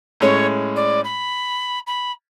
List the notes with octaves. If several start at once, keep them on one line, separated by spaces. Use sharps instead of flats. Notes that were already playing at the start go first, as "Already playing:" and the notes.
A2 G#3 C#4 C#5
D5
B5
B5